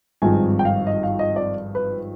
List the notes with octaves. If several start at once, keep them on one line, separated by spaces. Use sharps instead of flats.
G#1 G2 F3 G#3 C4 G#5
G5
F5
D#5
F5
D#5
D5
B4